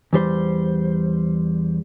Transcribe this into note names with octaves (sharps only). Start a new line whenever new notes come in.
E2 G3 C5